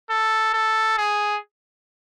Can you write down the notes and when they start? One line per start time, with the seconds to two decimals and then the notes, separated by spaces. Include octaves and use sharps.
0.10 A4
0.54 A4
0.98 G#4